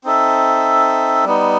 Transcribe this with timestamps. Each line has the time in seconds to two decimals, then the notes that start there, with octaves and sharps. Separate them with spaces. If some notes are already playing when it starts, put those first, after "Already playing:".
0.04 C4 D#4 A4 E5
1.24 G3 B3 D#4